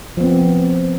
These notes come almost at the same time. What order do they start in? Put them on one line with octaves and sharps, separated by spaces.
F3 B3 C4